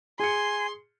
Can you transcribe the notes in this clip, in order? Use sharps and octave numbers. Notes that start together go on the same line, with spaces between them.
G#4 G#5 C6 C#7